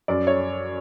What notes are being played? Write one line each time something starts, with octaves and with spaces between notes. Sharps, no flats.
F#2 D5
C#5